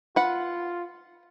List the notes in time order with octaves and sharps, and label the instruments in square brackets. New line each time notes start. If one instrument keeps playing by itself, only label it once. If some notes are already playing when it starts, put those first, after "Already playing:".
[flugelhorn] F4 [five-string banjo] B4 F#5